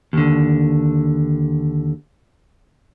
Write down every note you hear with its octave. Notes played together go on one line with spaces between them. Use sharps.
D#2 D3